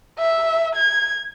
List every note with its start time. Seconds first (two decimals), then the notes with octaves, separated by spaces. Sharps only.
0.19 E5
0.75 G#6